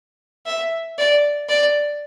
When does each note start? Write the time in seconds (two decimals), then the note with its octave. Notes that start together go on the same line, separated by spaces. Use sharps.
0.46 E5
0.98 D5
1.49 D5